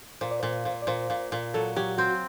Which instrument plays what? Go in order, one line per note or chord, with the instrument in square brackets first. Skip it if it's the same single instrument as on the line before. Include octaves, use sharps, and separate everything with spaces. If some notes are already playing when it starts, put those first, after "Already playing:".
[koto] A#2 [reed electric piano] C5
[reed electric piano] D5
[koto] A#2 [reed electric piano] C5
[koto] A#2
[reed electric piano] D5
[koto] A#2 [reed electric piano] C5
[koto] A#2
A#2
[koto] F#3 [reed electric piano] A4
[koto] F#3 [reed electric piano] G4
[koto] C4 [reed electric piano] F#4